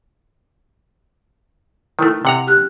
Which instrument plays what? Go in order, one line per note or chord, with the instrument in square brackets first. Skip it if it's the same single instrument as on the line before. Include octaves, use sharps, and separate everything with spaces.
[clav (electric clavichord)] D#3 A3 [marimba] E4
[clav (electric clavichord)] C3 F#5 A#5
[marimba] G4 F6 F#6